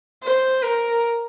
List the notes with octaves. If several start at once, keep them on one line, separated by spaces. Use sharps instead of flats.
C5
A#4